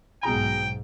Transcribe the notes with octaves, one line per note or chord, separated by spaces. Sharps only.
B1 G#2 B2 G#4 G5 A#5